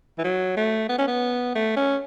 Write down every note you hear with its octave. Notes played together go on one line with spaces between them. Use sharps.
E3
F#3
A3
B3
C#4
B3
A3
C#4